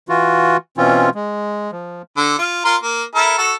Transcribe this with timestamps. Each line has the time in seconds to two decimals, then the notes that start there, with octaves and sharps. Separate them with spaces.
0.09 E3 F4 F#4
0.77 B2 E3 C4 C#4 F4
1.15 G#3
1.72 F3
2.17 D3
2.39 F4
2.65 F4 A#4 C6
2.83 A#3
3.15 E4 A4 A#4
3.38 F#4 A4